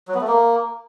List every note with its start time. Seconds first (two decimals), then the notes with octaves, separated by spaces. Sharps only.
0.08 F#3
0.14 B3
0.21 A3
0.27 A#3